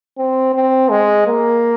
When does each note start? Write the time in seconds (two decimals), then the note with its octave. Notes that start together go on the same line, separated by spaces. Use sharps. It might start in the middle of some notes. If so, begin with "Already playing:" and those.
0.17 C4
0.54 C4
0.89 G#3
1.27 A#3